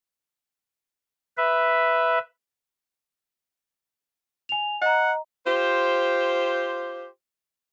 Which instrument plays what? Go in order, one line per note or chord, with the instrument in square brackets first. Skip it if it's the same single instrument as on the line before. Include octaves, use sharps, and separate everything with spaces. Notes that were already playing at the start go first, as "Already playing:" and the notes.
[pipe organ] B4 E5
[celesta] G#5 F7
[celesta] D#5 A#5 [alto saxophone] F#5
[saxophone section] F4 G4 C5